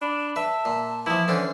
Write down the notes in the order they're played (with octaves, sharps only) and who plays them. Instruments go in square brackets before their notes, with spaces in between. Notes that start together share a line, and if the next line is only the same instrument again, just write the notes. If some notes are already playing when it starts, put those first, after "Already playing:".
[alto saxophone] D4 [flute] B5
[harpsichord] B4 [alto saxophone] E5 [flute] A5
[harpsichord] A#2
[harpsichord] E3 F3 [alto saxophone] E4
[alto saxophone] D3 [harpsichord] E3 C#4 [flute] C5